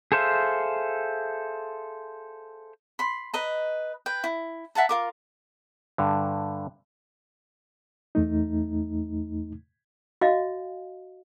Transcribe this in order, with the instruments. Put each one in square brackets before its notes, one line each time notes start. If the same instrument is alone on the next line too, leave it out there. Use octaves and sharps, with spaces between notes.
[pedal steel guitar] G#4 A4 C5 E5 F5
[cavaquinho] B5 C6
B4 D#5 A#5
B4 G5
E4
E5 F#5 A5 A#5
F4 A#4 D6
[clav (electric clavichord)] G2 D3
[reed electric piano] E2 A3 D#4
[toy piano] F#4 D#5 F5